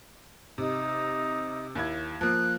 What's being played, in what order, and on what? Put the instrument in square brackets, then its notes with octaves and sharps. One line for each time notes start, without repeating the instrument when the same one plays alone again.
[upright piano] C3 [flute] D#4
[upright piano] D#2 E4 G#6
[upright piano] F3 A#3 [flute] F#6